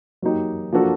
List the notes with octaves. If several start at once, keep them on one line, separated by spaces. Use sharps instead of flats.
F#3 A#3 D#4 G4
F3 A#3 D4 F#4 A4